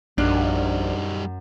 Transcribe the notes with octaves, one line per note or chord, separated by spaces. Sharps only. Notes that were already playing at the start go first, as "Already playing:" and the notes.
A#1 F#2 G3 D4 D#4 F6